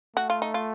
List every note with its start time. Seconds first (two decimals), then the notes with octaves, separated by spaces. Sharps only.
0.16 A3 F#4
0.30 F4
0.42 D#4
0.54 F4